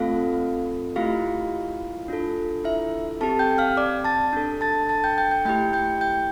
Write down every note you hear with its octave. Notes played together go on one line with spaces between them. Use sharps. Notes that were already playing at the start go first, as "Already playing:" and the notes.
Already playing: A3 C4 F4 A4 F5
A3 E4 F4 G4 F5
D4 F4 A4
E4 E5
C4 G4 A4 A5
G5 G6
F5 F6
D5 D6
A5 A6
D4 A4
A5 A6
A5 A6
G5 G6
G5 G6
G5 G6
A3 E4 G4 G5 G6
G5 G6
G5 G6